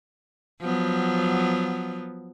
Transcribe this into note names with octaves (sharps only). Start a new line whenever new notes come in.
F3 F#3 B3